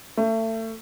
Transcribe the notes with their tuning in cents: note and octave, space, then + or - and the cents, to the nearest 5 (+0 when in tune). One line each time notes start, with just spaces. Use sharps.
A3 +30